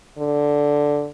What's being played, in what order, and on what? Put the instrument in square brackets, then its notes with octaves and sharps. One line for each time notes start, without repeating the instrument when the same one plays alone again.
[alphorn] D3